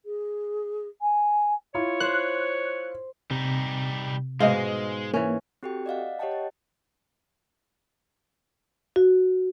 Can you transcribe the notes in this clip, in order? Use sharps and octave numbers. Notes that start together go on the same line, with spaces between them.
G#4
G#5
E4 F4 C#5
C5 F#6
C3 G3 D#4
G#2 B2 G#3 D#5 F5
E3 A#3 C#4
C4 F#4 G4 A4 G5
D5 D#5 F5 F#5
G4 C#5 D#5 F#5 G5 A5
F#5
F#4